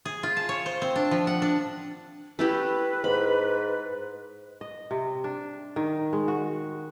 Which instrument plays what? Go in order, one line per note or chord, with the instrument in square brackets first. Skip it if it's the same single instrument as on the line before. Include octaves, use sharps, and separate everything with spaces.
[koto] G#4
F4
A5
C#5
C5
C4
D4
F3
F#5
D4
[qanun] A3 E4 G4 [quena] B4
[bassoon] G#2 [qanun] B5
[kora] D#5
C3
D4
D#3
G#3
F#4